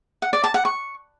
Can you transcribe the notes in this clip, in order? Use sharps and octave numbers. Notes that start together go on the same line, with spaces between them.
F#5
D5
A5
F#5
C#6